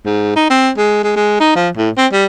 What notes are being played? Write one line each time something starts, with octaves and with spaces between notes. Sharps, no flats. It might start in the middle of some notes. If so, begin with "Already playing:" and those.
G#2
D#4
C4
G#3
G#3
G#3
D#4
F3
A2
C4
G3